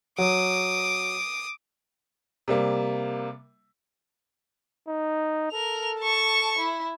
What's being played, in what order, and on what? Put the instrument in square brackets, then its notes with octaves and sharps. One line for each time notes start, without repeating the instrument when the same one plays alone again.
[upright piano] F#3 [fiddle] D6 D#6
[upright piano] C3 G3 A#3
[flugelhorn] D#4
[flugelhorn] A4 [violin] A#4 F7
[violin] A5 C#6
E4